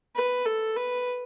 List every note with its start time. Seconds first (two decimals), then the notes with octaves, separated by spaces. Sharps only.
0.15 B4
0.45 A4
0.76 B4